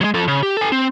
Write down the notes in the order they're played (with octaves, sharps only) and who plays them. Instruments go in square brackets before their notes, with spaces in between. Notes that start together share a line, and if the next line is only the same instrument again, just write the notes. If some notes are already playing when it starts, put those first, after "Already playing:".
[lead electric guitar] F#3 G#3
F3 A4
C#3
G4
A4 G#5
C4